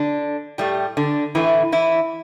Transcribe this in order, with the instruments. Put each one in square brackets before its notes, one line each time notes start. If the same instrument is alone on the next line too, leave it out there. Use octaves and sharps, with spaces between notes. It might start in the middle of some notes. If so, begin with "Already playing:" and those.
Already playing: [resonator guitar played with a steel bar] D3 D4
A2 G3 A3 G4
D3 D4
A2 E3 A3 E4
E3 E4